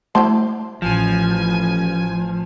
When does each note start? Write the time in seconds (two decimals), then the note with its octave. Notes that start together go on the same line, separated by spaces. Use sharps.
0.15 A3 E4 C5 A5 C6
0.82 A1 F3 G#5